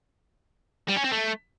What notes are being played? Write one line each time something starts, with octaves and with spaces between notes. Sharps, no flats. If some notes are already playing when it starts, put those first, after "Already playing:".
G3
C#4
C4
A3